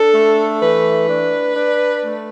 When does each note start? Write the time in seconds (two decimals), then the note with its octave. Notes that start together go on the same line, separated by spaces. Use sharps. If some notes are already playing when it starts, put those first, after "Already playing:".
Already playing: D4 A4
0.14 A3
0.60 E3 B4
1.08 D4
1.56 D4
2.03 A3